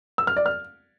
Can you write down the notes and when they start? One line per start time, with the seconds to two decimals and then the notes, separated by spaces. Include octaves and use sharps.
0.18 E6
0.27 F6
0.37 D5
0.46 F6